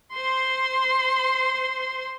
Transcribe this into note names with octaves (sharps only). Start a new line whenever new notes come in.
C5 C6